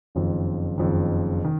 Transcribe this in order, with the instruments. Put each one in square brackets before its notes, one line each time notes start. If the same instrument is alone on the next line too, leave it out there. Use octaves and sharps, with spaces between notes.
[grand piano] F#1 F2 D#3
F#1 F2 D#3
D#3